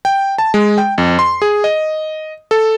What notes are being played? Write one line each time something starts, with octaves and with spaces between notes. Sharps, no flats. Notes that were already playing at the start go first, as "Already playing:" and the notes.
G5
A5
G#3
G5
F2
C6
G#4
D#5
A4